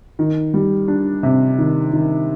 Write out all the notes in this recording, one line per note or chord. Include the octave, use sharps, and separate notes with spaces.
D#3
G3
D4
C3
D#3
D#3